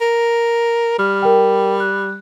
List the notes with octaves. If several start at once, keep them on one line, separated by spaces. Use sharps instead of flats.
A#4
G3 F6
A#4 G5
F#6